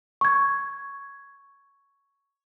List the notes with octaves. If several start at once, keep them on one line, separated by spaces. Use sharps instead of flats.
C#6 G#6